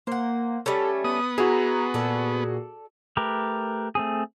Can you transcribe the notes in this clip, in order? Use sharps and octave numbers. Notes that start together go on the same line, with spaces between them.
A#3 C5 F#5
G3 A3 C#4 A4
B3 D#6
E4 F#4 G#4 A#5
A#2 A4 D5
A3 G4 A#4 B4
A3 C4 G#4